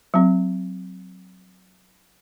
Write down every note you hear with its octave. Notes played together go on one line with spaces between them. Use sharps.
F#3 C4